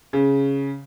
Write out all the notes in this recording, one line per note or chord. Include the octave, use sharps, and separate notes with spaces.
C#3